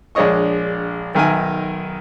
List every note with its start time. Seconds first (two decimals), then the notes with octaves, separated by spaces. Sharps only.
0.15 A#1 G#3 D4 C#5 D#5 C#6
1.15 B1 D#3 A#4 E5 G#5